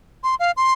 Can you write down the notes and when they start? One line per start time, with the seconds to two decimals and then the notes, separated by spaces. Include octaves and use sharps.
0.23 C6
0.40 F5
0.57 C6